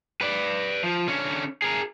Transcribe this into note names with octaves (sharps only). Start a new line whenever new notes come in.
B4 D5
F3
D3 C#4
G#4 A#4